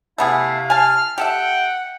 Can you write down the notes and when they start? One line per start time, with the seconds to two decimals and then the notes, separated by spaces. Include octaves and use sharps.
0.18 C3 A3 B3 E4 G#4 F5
0.70 G#5 A5 F6
1.18 G4 A4 E5 F#5 G5